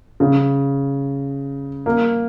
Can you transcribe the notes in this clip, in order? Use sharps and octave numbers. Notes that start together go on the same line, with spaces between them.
C#3
A#3